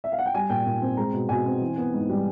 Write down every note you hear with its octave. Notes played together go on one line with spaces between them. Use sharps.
E5
F5
F#5
G5
G3 G#5
A#2 G5
A#2
C4
G#3 A#5
B2
B2 G#5
C4
E3
B3
G#2
G3